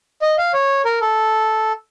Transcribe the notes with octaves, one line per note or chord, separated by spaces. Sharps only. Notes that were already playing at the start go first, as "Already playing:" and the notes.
D#5
F5
C#5
A#4
A4